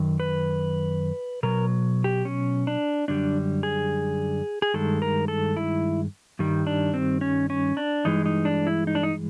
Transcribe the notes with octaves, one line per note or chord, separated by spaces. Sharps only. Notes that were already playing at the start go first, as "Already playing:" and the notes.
Already playing: F#2 D#3
B4
B2 F#3 A#4
G4
C#4
D4
F#2 D3 G3 D4
G#4
G#4
G2 D#3 G#3 A4
A#4
A4
E4
G2 D#3 G3
D4
C4
C#4
C#4
D4
G2 E3 G#3 D#4
D#4
D4
E4
D#4
D4
D#4